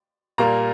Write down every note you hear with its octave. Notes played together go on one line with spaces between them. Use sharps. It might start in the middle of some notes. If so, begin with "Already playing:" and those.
A#2 G3 A#3 A#5